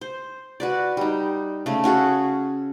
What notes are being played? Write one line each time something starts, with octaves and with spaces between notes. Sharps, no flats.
C5
F#4 B4 D5
G3 D#4
C#3 A3
C#4 F#4 G#4 A4